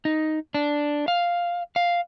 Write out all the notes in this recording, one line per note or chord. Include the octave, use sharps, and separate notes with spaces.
D#4
D4
F5
F5